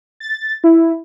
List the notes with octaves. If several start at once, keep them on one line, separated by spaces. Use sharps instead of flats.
A6
E4